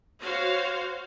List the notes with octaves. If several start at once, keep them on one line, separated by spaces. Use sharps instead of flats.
F#4 C5 C#5 F5